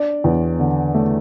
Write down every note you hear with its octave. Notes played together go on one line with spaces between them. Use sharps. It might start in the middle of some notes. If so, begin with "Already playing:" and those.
Already playing: D4 D5
E2
D3
A3